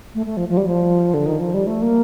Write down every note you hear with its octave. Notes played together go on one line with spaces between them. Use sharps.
A3
A3
F3
F3
G3
F3
D3
D#3
F3
G3
A3
A#3